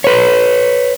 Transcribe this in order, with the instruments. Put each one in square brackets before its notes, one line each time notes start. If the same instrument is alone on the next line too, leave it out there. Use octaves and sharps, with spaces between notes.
[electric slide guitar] B4 C#5